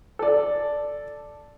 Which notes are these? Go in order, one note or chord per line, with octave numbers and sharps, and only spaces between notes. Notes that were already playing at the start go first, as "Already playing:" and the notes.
A4 D5